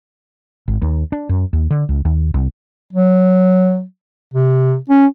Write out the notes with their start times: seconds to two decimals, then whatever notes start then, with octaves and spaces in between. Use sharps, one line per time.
0.68 G#1
0.82 D#2
1.12 D4
1.29 F#2
1.53 D#2
1.71 D3
1.89 C#2
2.05 D#2
2.34 C2
2.93 F#3
4.34 C3
4.90 C#4